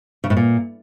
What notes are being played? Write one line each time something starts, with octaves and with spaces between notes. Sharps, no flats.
C#3
A2
A#2